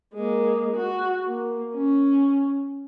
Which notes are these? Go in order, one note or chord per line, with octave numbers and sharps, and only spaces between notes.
G#3 A#3
F#4
A#3
C#4